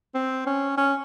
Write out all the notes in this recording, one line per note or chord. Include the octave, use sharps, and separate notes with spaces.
C4
C#4
C#4